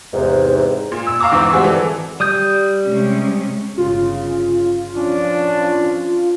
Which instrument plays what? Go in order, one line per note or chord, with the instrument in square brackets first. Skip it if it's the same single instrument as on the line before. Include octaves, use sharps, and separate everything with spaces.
[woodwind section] E2 G#2 C3
[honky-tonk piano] A#2
E6
F5 A#5 C#6 D6 E6
E2 G#2 E3 C4 D6 E6
G3 G#3 C4 F#4 G#4
E3 A4
[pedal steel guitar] G3 D#6 G6
[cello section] C3 G#3 C#4
[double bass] G1 C#3 [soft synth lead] F4
[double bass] F3 C#4 [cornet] D4